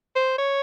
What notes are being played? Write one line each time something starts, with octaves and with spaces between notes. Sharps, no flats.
C5
C#5